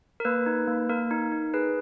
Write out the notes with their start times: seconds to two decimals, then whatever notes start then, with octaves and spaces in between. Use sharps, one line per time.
0.20 A#4
0.25 A#3 B4
0.46 D#4
0.68 A#3
0.89 A#3 A#4
1.11 D#4
1.32 D#4
1.54 G#4 B4